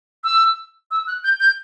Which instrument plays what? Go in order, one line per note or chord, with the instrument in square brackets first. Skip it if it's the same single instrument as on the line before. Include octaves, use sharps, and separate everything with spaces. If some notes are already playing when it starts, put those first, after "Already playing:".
[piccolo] E6
E6
F#6
G6
G6